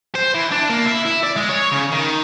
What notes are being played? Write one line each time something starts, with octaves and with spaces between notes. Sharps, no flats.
C5
E3
D4
A#3
E4
E4
D5
G#3
C#5
C#3
D#3